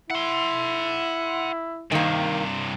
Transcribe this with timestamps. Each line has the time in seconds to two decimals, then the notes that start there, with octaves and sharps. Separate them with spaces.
0.10 E4 F#5 C6
1.92 G2 C3 D#3 A#3